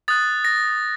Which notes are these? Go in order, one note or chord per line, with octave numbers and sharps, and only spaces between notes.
D#6 F#6 A6
A#6